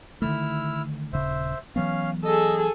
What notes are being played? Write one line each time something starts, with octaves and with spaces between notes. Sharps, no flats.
D3 D#3 A3 E4 E6 F6
D#1 C#3 C5 E5
E3 F#3 B3 C#4 F5
G#4 A4 D#5 D#6 E6